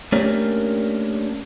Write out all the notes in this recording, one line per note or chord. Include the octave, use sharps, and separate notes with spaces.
A3 A#3 C#4 D4 G4 A#4